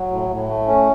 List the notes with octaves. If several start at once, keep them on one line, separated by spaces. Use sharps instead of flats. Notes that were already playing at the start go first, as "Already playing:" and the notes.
Already playing: F#3
A2
A2
A3
C#4